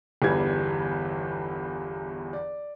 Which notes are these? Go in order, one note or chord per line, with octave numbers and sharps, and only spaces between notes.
G1 E2 E3 G3 G#6
D5